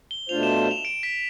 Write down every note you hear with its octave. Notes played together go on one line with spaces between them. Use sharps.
G7
B2 A3 D4 F4 C5 F7
E7
E7
F7
D7
B6